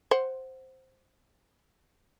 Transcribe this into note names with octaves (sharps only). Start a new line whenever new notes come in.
C5 F#5